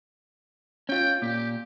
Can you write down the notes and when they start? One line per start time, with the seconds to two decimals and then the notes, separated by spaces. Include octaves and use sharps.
0.89 C#4 F4 G5
1.22 A#2 G4